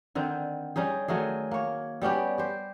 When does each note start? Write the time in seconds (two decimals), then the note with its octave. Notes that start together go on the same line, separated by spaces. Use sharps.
0.15 D3 D#3 C4
0.76 G3 C#4 D#4 G#4
1.08 D#3 F#3 A3 G#4
1.51 A#3 C#5
2.02 G3 B3 C#4 G4
2.38 G4 C5